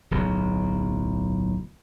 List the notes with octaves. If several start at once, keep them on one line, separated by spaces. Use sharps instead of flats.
D1 B1 B2